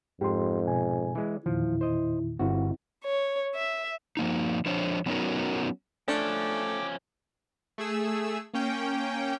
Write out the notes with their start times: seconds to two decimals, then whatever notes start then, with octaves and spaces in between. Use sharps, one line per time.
0.21 F2 G#2 G4 C6
0.67 B2 G#5
1.15 E3 G#3
1.46 E2 A#2 D#3 F3 E4
1.81 C5 D#5
2.39 G1 C4 E4 F#4
3.04 C#5
3.55 E5
4.17 F3 A#3 D#4
4.66 F3 D4 C5 C#5
5.06 F#3 B3 C#4 D#4 F#4 A#4
6.08 F3 A3 C#4 D4 G5 D6
7.78 A3 G#4 E6
8.54 A#3 C#4 G5